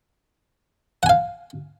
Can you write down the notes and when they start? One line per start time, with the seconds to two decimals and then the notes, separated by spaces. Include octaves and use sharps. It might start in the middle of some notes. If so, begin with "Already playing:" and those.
1.03 F#5
1.06 G#5
1.09 F5